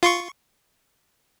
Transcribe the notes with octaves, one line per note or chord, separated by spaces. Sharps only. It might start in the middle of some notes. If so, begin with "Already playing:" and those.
F4 C6 C#6